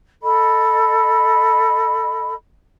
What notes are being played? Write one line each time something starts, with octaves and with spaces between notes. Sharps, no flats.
A4 D#5 B5